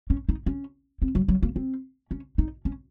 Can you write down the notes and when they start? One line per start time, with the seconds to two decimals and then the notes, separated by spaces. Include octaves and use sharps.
0.10 C#4
0.29 D#4
0.46 C#4
1.02 C4
1.15 F#3
1.28 F#3
1.43 A#3
1.56 C4
2.11 C#4
2.38 D#4
2.65 C#4